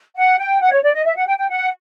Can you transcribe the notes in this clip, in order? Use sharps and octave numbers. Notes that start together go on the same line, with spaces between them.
F#5
G5
F#5
C#5
D5
D#5
E5
F#5
G5
G5
F#5